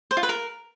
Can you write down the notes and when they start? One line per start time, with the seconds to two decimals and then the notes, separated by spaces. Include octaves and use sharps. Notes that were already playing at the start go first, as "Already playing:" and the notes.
0.11 C5
0.17 F4
0.23 B4
0.29 A#4